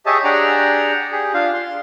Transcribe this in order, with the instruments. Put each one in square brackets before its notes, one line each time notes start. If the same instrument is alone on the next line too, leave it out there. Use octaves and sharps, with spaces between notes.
[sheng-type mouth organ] G4 G#4 C#5 D#5 E5 A5
D4 G4 G#4 D5 F#5 A#5
G4 G#4
D4 F4 F5
C6